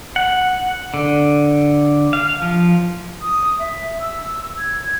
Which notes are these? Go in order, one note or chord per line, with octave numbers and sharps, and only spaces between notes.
F#5
D3
F5
F3
D#6
E5
E6
G#6